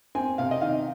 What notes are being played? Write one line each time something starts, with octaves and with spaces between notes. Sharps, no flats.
C4 G#5
C3 F5
D#5
D#3 F5